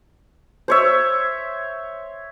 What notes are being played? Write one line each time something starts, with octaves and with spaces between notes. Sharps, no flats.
C5 C#5 E5